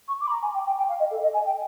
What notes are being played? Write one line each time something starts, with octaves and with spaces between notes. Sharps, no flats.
C#6
D6
B5
A#5
G#5
G5
G5
G5
F5
D#5
A4
D#5
G#5
G5